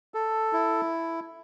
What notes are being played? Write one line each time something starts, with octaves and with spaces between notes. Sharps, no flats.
A4
E4